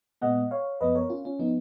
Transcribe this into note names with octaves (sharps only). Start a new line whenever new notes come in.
A#2 G#3 B3 D#5 F#5
C#5 F5
F#2 F3 B3 B4 D#5
A#4 C#5
C#4 F4
C#4
F3 B3 D#4